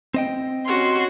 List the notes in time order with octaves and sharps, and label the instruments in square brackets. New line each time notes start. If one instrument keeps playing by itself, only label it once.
[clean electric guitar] C4 D#5 G5
[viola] C#4 F#4 [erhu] C6